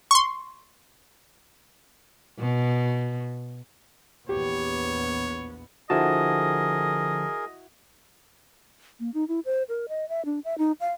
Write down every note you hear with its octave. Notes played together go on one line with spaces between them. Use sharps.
C6 C#6
B2
A#1 E2 B3 G4 C#5
D3 F3 E4 F#4 G#4 A#4 D#5 A5
A#3
D#4
E4
C5
A#4
D#5
E5
D4
E5
D#4
F5